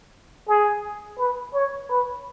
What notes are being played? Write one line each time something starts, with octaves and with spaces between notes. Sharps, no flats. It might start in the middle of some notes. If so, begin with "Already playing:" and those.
G#4
B4
C#5
B4